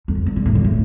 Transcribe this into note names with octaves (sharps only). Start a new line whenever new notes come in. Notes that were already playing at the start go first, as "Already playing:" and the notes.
F2
G2
A#2
A2
A#2
A2